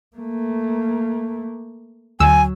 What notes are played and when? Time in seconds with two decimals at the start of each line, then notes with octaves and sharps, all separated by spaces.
0.16 A3 A#3
2.20 D2 F#3 G#5 E6